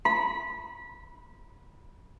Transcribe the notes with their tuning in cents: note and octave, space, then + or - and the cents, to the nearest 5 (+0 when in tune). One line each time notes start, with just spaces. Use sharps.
B5 -20